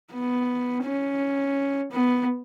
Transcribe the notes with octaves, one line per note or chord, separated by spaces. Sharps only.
B3
C#4
B3